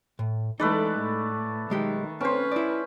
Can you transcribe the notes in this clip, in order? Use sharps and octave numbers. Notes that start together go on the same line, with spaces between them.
A2
E3 G#3 A3 D#4 B4 D5
A2
B1 D#3 G#3 G4
C4 C#4 B4 C5
E4 D5